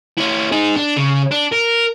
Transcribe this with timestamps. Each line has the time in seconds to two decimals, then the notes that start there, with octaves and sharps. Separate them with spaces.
0.18 C#4 E4
0.52 D#4 G#4
0.76 D4
0.97 C#3
1.31 D4
1.52 A#4